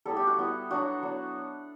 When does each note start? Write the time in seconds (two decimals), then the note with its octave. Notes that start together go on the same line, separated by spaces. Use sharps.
0.06 G3 B3 E4 A4
0.17 G4
0.27 F#4
0.38 G3 B3 E4
0.70 F#3 B3 D4 F#4
1.02 F#3 B3 D4